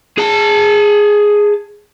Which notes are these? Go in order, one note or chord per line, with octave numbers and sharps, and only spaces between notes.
G#4 A5